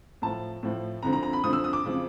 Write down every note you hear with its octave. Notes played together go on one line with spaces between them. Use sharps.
A2 F3 A5
A2 F3
F2 D3 F3 A#5
A#5
A#5
B5
F2 D3 F3 D#6
E6
D#6
D6
F2 C#3 F3